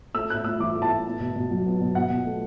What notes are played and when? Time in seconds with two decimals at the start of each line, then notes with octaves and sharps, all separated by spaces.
0.14 A3 E6
0.30 A2 F#6
0.45 A2 E6
0.60 E3 D6
0.75 A3
0.82 A5
0.90 A2
1.05 B3
1.20 B2
1.36 B2
1.51 F#3
1.66 B3
1.81 B2
1.95 B2 F#5
2.10 B2
2.26 A3